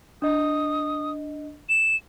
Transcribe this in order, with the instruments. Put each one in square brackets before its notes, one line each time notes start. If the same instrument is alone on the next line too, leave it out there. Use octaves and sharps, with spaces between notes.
[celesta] D4 D#5 [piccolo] D#6
[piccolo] E7